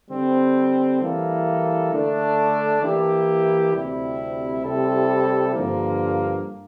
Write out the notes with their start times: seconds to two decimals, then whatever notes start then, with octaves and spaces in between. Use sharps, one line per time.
0.10 D3 G3 C4
1.00 E3 G3 A#3 E4 A4
1.91 D3 A3 D4 A4
2.82 E3 A#3 E4 G4
3.73 D2 C3 G3 C4 E4
4.64 C3 G3 C4 E4 A4
5.54 G2 D3 F3 A#3